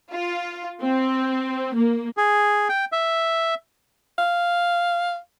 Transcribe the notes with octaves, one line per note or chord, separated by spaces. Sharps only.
F4
C4
A#3
G#4
G5
E5
F5